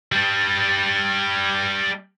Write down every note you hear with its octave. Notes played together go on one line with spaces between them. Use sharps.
G3 D4